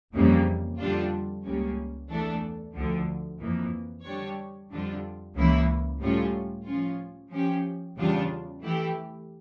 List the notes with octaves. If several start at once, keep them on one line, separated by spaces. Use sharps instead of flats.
F2 C#3 E3 G3 A#3
F2 D3 G3 D4 F4
C#2 C#3 G3 A#3 C#4
E2 E3 A3 D4 A4
D2 D3 F3
F2 E3 A#3
D3 G3 D4 G4 C#5
F2 D3 G3 D4 F4
C#2 C#3 E3 A#3 E4
A2 G3 C#4 F4
F3 C#4 F4
F3 C#4 G4
E2 C#3 G3 D4 F4
E3 A3 E4 G4